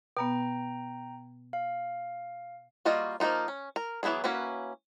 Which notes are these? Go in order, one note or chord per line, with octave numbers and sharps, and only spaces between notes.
B2 B3 G5 A#5
F5
G3 A#3 F4 F#4 D#5
F3 A#3 B3 D#4 F4
C#4
A#4
E3 F#3 B3 E4 G#4
A#3 C#4 E4 F#4 B4